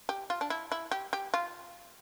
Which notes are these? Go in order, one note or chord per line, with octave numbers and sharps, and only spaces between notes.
G4
F4
D4
E4
E4
G4
G4
F4